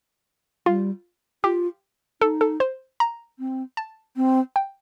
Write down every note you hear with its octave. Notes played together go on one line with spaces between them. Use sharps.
G3 F4
F4 G4
D#4 A4
A4
C5
A#5
C4
A5
C4
G5